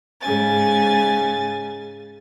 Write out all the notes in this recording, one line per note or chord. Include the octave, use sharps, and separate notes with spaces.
G#2 C#3 G#5 A6